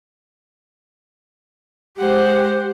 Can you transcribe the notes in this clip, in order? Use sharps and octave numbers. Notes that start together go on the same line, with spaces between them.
G#3 G4 C5 F#5